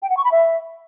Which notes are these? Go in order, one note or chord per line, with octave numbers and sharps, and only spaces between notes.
G5
F#5
C#6
B5
E5